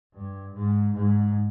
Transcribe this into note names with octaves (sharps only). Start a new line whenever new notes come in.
G2
G#2
G#2